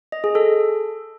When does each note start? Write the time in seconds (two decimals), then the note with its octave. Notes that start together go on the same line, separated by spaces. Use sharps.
0.12 D#5
0.24 G#4
0.35 A4